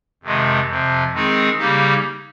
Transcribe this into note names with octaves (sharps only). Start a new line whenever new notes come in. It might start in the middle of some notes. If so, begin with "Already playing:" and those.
F2 C3 D#3 G#3
F2 C3 F3
D#3 G#3 C4 D#4 G#4
C#3 G3 A#3 D#4 G4